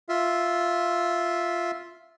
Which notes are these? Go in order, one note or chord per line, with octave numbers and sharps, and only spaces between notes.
F4 E5